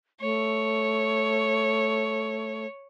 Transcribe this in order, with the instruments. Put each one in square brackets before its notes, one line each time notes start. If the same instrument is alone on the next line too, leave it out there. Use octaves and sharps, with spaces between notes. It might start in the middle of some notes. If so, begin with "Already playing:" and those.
[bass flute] A3 [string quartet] C#5